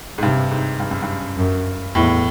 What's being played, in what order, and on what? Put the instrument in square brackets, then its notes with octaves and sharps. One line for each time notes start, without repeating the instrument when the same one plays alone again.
[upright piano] G#2
[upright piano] G2 [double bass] C3
[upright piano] G#2
G2
F#2
G2
[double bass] F#2
[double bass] E2 [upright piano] A2